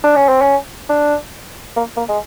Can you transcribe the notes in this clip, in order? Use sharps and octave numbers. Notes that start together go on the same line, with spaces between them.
D4
C#4
C4
C#4
D4
A#3
A#3
G#3